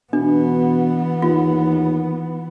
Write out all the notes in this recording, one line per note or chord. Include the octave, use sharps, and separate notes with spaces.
B2 E3 B3 D4
D#2 F4